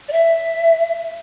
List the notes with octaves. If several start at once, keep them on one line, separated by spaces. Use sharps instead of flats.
D5
E5